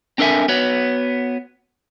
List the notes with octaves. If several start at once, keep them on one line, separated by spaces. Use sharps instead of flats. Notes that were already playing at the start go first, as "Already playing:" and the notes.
C4 D4 A4 A#4 E5 G#5
B3 F#4 C#5